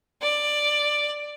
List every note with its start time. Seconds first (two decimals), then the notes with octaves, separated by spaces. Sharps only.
0.22 D5